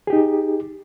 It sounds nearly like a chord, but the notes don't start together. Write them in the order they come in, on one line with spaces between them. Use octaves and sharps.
G#4 G4 D#4